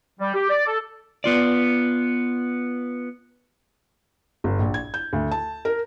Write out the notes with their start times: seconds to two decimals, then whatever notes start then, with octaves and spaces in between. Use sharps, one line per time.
0.20 G3
0.35 G4
0.50 D5
0.67 A4
1.24 B3 F4 D5
4.44 G1
4.59 A#1
4.74 G#6
4.94 G6
5.13 D2
5.31 A5
5.65 A#4